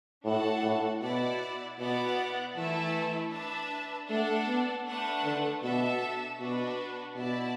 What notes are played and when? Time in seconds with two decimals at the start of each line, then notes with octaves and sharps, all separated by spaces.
0.25 A2 D4 F#4 A4 F#5 A5
0.63 A2
1.01 B2 E4 D5 F#5
1.78 B2 B3 E4 B4 D5 F#5
2.55 E3 A3 E4 A4 E5 A5
3.32 D4 B4 E5 A5
4.09 A3 D4 A4 D5 F#5 A5
4.47 B3
4.86 A3 D4 B4 F#5 A5
5.24 D3
5.63 B2 D4 A4 E5 A5
6.39 B2 D4 F#4 B4
7.16 B2 E4 D5 A5